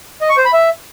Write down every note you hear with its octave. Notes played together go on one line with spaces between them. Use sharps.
D#5
C#6
C5
B5
E5